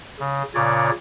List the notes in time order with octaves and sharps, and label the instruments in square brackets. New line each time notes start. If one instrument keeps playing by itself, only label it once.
[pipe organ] C#3
A#2 C#3 C#5 D5